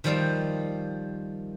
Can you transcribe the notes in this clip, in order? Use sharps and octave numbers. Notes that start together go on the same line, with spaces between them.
D#3 F3 G3 C5 F5